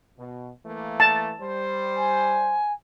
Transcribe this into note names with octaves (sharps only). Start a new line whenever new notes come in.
B2
E3 A3 A#3
A5
G3 C5
G#5